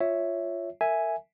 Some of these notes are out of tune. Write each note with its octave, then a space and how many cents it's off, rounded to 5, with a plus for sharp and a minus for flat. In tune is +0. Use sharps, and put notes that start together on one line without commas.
F4 +0 C#5 +0 E5 +0
A#4 -30 E5 +0 G#5 +0